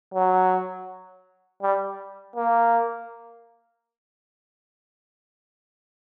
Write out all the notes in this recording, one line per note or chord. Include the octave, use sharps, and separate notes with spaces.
F#3
G3
A#3